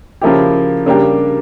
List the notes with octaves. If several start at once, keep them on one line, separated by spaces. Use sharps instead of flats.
C#3 F3 A#3 E4 G4
C#3 G3 A#3 D4 G4